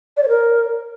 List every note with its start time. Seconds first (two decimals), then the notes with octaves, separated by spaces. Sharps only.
0.17 D5
0.23 C#5
0.29 A#4